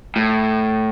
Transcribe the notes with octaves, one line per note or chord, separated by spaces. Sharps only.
A2